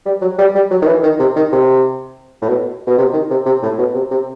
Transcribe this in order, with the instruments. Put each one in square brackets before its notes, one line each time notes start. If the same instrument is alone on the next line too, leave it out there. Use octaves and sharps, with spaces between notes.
[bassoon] G3
F#3
G3
G3
F#3
D#3
E3
D#3
C3
D#3
C3
A2
B2
B2
C3
D#3
C3
C3
A2
B2
C3
C3